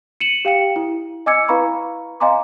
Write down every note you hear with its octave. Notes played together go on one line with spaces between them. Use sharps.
C#7 D#7 E7 F#7
G4 F5 G5 C#7
E4
D#5 G#5 D6 E6 G#6 C#7
E4 B4 F5 A#5 B5 C#6
D#5 F5 G#5 A#5 C6 D6